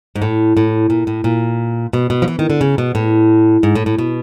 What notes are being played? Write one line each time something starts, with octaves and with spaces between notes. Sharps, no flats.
G#2
A2
A2
A#2
A2
A#2
B2
B2
F3
E3
D#3
D3
C#3
B2
A2
G#2
A2
A2
B2